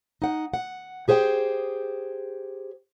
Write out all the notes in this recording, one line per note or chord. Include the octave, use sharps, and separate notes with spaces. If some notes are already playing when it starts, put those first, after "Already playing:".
D#4 F#5
F#5
G4 G#4 C5 F5 G5